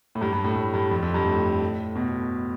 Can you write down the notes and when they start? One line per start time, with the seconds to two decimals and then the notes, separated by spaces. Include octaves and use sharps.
0.15 A2
0.21 G2
0.33 G2
0.44 A2
0.56 A2
0.74 G2
0.91 F2
1.03 F2
1.14 G2
1.26 A2
1.96 B2